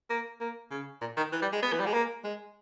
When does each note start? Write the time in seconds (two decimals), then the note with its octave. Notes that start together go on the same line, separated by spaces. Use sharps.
0.10 A#3
0.41 A#3
0.71 C#3
1.01 A#2
1.17 D#3
1.33 E3
1.42 G3
1.53 G#3
1.63 B3
1.73 E3
1.80 G3
1.86 G#3
1.94 A#3
2.24 G#3